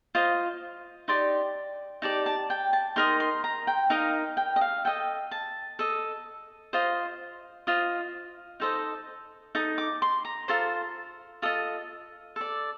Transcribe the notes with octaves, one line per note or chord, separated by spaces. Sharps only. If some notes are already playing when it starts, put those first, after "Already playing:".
F4 C5 D#5
D#4 G4 D5 C6
D#4 G4 D5 A5
A5
G5
A5
D#4 A#4 D#5 C6
C6
A#5
G5
D#4 A#4 D#5 F5
G5
D#5
F5
A4 D#5 G5
A5
A4 D#5
F4 C5 D#5
F4 C5 D#5
D#4 A4 C5 D#5
D#4 A4 D#6
D6
C6
A#5
F4 A4 C5 C6
F4 A4 D#5 D#6
A4 D5